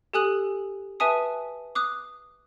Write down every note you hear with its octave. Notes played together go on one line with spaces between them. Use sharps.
G4 A4 G#5 D#6 F#6 F#7
B4 E5 G#5 A5 D#6
D6 D#6 F#6